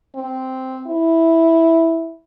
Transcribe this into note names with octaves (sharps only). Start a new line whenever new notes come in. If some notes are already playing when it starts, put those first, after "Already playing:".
C4
E4